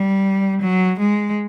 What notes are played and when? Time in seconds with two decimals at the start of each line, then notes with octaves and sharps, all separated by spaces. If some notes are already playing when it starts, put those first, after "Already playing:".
Already playing: G3
0.62 F#3
0.99 G#3